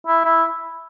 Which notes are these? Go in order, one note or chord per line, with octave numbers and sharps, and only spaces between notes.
E4
E4